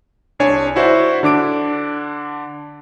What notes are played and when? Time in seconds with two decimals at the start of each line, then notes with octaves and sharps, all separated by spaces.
0.39 C2 D4 C#5 G#5
0.76 E4 F#4 C5 D5 E5
1.23 D3 D4 D6 D7